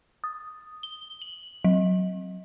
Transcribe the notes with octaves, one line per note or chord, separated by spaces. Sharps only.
D#6
G7
F#7
F#3